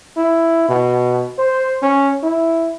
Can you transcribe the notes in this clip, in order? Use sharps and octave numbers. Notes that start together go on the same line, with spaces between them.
E4
B2
C5
C#4
E4